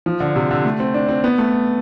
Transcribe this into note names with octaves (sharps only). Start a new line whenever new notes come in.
F3
D3
C3
D3
A3
C4
D4
C4
B3
A3